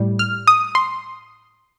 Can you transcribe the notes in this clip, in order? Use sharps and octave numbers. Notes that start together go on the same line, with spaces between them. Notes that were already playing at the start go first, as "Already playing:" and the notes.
Already playing: A2 G3
F6
D#6
C6